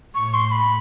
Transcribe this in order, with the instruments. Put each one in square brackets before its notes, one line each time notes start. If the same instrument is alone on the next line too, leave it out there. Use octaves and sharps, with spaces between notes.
[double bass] A2 [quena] C#6
[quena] C6
B5